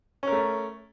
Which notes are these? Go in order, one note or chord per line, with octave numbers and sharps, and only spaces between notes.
A3 C#4 A#4